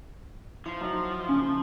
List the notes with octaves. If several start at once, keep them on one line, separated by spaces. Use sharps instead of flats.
F3 E4
F#3 D#4
C#3 C#4